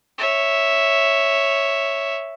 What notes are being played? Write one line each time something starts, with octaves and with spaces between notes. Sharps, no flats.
C#5 E5